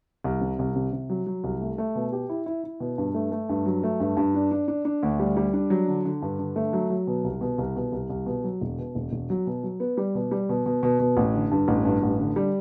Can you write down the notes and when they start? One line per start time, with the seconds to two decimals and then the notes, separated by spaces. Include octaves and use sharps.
0.24 C2
0.41 C3
0.59 C2
0.76 C3
0.93 C3
1.10 F#3
1.27 F#3
1.44 C2
1.61 A3
1.78 A3
1.95 B2
2.12 G4
2.29 E4
2.46 E4
2.64 E4
2.80 B2
2.98 G2
3.14 A3
3.32 A3
3.49 G2
3.66 F#3
3.83 A3
4.00 G2
4.17 G2
4.34 D4
4.51 D4
4.68 D4
4.85 D4
5.03 D2
5.19 G3
5.37 G3
5.53 D4
5.70 F#3
5.88 D3
6.05 D3
6.22 G2
6.39 D3
6.56 A3
6.73 F#3
6.90 F#3
7.07 B2
7.24 C2
7.41 B2
7.58 C2
7.76 B2
7.92 C2
8.10 C2
8.26 B2
8.44 F#3
8.61 E1
8.78 B2
8.95 E1
9.12 E1
9.30 F#3
9.47 B2
9.64 F#3
9.80 B3
9.97 G3
10.15 B2
10.31 G3
10.49 B2
10.66 B2
10.83 B2
11.00 B2
11.17 A1
11.34 D3
11.51 G2
11.68 A1
11.85 G2
12.03 A1
12.19 D3
12.36 G3